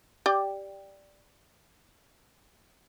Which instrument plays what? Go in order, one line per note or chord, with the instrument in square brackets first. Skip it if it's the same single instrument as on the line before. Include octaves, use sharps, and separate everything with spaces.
[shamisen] G4 D5 G5